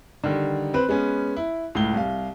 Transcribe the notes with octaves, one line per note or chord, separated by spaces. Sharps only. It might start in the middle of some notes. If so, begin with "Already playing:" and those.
D3 D#3 G3
C4 B4 F#6
G#3 B3 C#4
E4
C#2 A2 G7
C2 F5